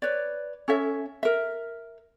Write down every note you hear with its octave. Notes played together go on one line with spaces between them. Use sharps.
B4 C#5 D5
C#4 A4 C#5 E5
A#4 E5